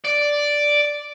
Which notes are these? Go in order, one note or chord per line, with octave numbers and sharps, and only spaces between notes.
D5